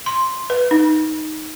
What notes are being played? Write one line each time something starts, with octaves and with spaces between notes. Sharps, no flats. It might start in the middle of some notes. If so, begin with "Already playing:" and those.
C6
B4
D#4